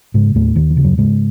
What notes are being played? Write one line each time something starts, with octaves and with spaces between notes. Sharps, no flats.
G#2 C#3 G#3
D#2 A2 A3
D#2 D#3
E3
C#3
F#2 F#3
G#2 C#3 G#3